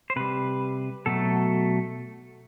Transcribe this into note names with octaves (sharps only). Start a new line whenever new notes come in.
C5
C3 G3 B4
B2 F#3 A3 A4